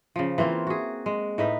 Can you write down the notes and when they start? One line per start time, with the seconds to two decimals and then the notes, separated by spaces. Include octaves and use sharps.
0.16 C#3 F3
0.38 E3 A#3 C4 F4
0.67 F#4 G#4
1.06 G#3
1.38 A2 D#4 B4 E5